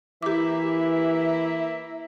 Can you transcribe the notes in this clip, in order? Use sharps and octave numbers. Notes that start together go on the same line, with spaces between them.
E3 A#3 E4 G4 E5 D6